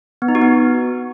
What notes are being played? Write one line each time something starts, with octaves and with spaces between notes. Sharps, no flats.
B3
D#4
F#4
B3